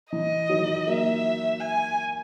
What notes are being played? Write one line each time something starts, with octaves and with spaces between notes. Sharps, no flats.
E3 D#5
D#3 F#3
F#3 A#3 E5
G#5